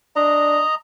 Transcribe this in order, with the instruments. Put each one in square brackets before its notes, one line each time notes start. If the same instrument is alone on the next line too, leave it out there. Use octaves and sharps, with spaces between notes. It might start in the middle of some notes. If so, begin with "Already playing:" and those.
[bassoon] D4 [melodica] D#5 A#5